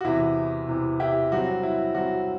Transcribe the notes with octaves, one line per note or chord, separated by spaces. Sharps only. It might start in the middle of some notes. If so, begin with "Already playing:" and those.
F#4
E2 C3 E3 E4
E2 C3 E3
E4 G4
G2 F#3 C4 F#4
E4
G2 F#3 C4 F#4